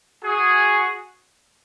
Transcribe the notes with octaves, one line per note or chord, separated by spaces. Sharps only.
F#4 G#4